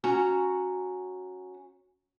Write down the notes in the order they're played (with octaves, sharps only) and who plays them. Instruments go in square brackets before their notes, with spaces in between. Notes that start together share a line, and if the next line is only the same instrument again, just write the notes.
[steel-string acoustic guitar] C#4 F#4 A#5